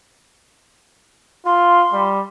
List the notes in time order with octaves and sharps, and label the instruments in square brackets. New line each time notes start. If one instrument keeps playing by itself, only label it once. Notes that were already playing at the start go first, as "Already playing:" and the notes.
[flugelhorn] F4 [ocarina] C6
[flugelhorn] G3